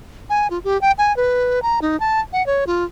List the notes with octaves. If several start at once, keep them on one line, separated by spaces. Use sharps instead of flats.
G#5
F4
G4
G5
G#5
B4
A#5
D#4
A5
F#5
C#5
F4